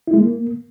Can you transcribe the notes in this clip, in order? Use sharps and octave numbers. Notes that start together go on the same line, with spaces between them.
E4
G#3
A#3